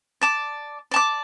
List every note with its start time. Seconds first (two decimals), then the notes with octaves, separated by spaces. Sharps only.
0.21 D5 A5 D6
0.91 D5 A5 D6